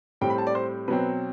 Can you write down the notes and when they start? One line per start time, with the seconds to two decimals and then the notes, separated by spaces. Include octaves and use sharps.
0.21 A2 G3 C4 G5
0.30 B5
0.38 A5
0.47 D5
0.55 C5
0.88 B2 F#3 C4 B4